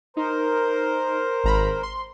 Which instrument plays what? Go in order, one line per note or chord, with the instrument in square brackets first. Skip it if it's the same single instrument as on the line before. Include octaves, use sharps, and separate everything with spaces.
[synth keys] D#4 [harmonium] A#4 C5
[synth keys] G#1 A#5 B5
C6